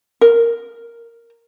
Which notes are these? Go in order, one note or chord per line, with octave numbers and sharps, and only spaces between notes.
A#4